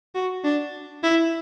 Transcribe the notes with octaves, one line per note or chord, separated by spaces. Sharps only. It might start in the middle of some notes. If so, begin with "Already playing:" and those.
F#4
D4
E4